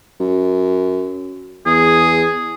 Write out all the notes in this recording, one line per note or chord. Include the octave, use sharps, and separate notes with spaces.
F#2
E2 G#4